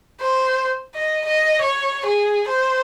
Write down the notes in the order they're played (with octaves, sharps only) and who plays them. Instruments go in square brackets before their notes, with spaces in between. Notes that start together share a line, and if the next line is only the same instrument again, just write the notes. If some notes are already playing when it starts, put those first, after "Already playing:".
[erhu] C5
D#5
D#5
C#5
G#4
C5